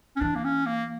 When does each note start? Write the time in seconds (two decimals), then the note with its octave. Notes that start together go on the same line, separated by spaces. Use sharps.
0.16 C#4
0.21 E3 D4
0.35 A#3
0.44 C#4
0.66 A#3